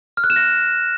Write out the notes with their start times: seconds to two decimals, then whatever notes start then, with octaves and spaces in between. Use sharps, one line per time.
0.17 F6
0.24 F#6
0.30 E7
0.36 A#6